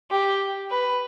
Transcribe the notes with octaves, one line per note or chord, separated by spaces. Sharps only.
G4
B4